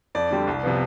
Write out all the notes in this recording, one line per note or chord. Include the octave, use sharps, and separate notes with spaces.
F2 D5
D3 G3 C4
C2
C3 F3 B3